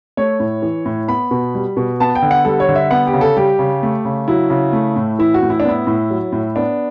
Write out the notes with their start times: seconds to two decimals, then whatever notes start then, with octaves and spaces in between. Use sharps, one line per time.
0.17 A3 C#5
0.40 A2
0.62 E3
0.86 A2
1.08 B3 B5
1.31 B2
1.55 G3
1.77 B2
2.00 B3 A5
2.15 G5
2.22 D3
2.31 F#5
2.45 G3 A4
2.60 C#5
2.69 D3
2.75 E5
2.91 B3 F#5
3.07 G4
3.13 C#3
3.21 A4
3.37 G3 G4
3.59 C#3
3.83 A3
4.05 C#3
4.28 F#3 E4
4.50 C#3
4.73 A3
4.96 A2
5.19 E3 E4
5.34 F#4
5.42 A2
5.50 E4
5.60 D4
5.65 B3 E4
5.87 A2
6.10 F#3
6.32 A2
6.56 B3 D4